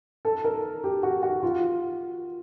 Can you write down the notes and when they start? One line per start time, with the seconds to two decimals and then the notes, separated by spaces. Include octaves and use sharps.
0.25 A4
0.44 A#4
0.84 G4
1.03 F#4
1.23 F#4
1.43 F4